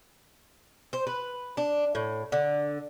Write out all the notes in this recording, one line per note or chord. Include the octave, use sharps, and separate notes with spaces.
C5
B4
D4
A2
D3